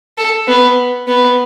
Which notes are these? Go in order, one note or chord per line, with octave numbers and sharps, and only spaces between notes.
A4
B3
B3